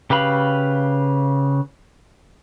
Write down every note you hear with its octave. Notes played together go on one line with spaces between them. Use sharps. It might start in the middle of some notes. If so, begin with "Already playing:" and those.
C#3 G4 B4 F5 B5